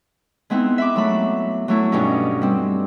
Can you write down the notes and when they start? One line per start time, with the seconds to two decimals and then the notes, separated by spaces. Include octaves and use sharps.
0.50 G#3 B3 C4 D#4 E4
0.78 E5 B5 D6
0.96 F#3 A3 B5
1.68 F#3 A3 E4
1.92 G2 B2 C#4 D#4
2.41 G3 C4